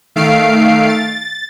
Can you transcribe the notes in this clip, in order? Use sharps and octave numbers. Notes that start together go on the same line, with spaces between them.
D#3 A3 F5 C7 D7
A6